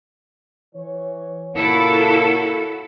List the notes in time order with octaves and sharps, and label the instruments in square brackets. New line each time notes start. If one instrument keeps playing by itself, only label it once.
[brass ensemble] E3 C#5
[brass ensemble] A#2 C#3 A#3 [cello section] E4 F#4 A4